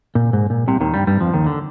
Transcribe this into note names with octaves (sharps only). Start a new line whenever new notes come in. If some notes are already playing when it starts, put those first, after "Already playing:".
A#2
G#2
A#2
C2 C3
D#2 D#3
G2 G3
G2 G3
F2 F3
D#2 D#3
D3